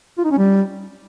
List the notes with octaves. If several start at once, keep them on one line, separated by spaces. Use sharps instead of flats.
F4
D#4
C#4
G3